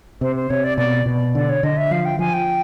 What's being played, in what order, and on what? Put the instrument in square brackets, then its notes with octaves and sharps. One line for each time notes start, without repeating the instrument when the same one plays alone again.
[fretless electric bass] C3 [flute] C5
[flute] C5
[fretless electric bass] C3 [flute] C#5
[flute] D5
[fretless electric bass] B2 [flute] D5
[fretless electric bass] B2
[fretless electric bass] D3 [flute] D5
[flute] C#5
[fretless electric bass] D3 [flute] D#5
[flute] E5
[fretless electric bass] F3 [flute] F5
[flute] G5
[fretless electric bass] F3 [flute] G#5
[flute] G5